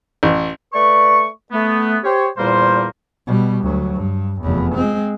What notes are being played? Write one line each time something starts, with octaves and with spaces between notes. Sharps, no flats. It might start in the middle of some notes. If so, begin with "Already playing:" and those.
A1
A3 B4 D5 C#6
A3 B3
G4 C5 C#5
E2 A#2 G3 A#3 C5
B2 G3
D2 F#3
G2
F1 E2
G#3 C4